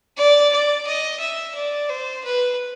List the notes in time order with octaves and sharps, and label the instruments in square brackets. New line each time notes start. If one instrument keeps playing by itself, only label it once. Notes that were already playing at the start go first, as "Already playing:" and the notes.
[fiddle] D5
D5
D#5
E5
D5
C5
B4